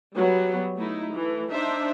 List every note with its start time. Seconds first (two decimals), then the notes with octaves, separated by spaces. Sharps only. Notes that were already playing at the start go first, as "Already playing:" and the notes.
0.17 F#3 G3 B3
0.78 A3 D#4 E4
1.14 E3 A3
1.53 D4 D#4 C5 E5